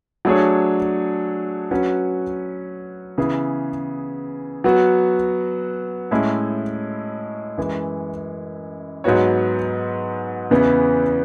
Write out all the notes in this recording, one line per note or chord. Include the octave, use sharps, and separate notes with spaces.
F#3 A3 D4 G#4 C#5
F#3 C#4 F#4 B4
C#3 E3 B3 E4 G#4
F#3 B3 F#4
A2 G#3 C#4 E4 A4
F#2 E3 G#3
G#2 F#3 B3 F#4 C#5
E2 C#3 E3 B3